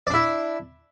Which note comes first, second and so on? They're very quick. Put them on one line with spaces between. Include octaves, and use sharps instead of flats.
D5 D4 E4